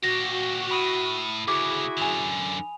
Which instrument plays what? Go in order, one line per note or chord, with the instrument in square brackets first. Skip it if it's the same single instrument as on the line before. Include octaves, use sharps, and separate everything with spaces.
[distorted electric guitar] A#2 G4 [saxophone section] F#4 [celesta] A#6
[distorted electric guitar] A2 [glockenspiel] B5 D#6 D#7
[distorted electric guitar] D2 C#3 [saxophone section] E4 F#4 G#4 [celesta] D6
[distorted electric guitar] F#2 D3 [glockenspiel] G#5 F7